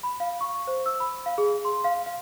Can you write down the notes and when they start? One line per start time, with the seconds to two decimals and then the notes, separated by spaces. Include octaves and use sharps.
0.03 B5
0.20 F5
0.41 C#6
0.67 C5
0.86 E6
1.00 B5
1.26 F5
1.38 G#4
1.65 C6
1.84 F5
2.06 F5